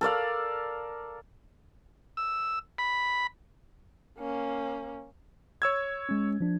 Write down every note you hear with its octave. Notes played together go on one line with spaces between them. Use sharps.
A4 A#4 D5 F5
E6
B5
A#3 C#4
C#5 E6 G#6
G#3 C#4
F3 D4